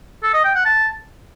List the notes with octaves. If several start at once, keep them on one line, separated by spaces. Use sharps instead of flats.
A4
D#5
G5
F#5
A5